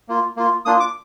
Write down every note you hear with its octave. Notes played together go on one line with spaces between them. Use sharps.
A#3 F4
A#3 F4
A#3 D4 F4 D#6
D6